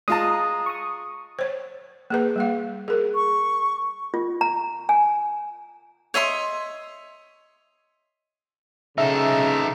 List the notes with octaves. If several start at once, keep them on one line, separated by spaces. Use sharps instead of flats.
G#3 F4 A5 A#5 D#6
C#6 D#6
C5 C#5
A#3 G#4 B4
G3 A#3 F5
G#4 A#4
C#6
F4
A#5
G#5
C#5 D#5 E5 C6
C#3 D#4 A4 E5